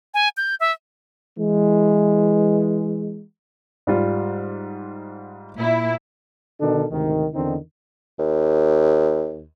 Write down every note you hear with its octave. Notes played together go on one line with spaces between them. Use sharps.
G#5
G6
E5
E3 G#3
G#2 G3 F4
A#2 E4
B2 D3 D#3 D4 A4
D2 G#2 C3 D#3
E2 D3 D#3 C4 D#4
D#2